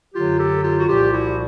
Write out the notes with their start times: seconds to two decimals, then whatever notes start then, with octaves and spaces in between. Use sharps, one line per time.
0.14 F#2 D3 F#3 F4 G4
0.38 G4 A4
0.63 F4 G4
0.79 F#4
0.87 C2 A#2 F3 F4 G4
1.12 E4 F#4